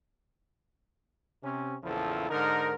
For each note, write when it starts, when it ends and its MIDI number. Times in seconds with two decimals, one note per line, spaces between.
1.43 1.74 48
1.43 1.74 61
1.82 2.29 34
1.82 2.29 40
1.82 2.29 49
1.82 2.29 53
1.82 2.29 64
1.82 2.29 69
2.29 2.74 44
2.29 2.74 50
2.29 2.74 63
2.29 2.74 70